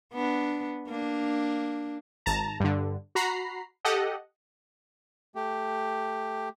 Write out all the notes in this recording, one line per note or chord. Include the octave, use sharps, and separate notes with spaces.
B3 D4
A#3 D4
G#1 A5 A#5
G2 D3
F#4 A#5 B5 C7
G4 A4 D#5 F#5
A3 G4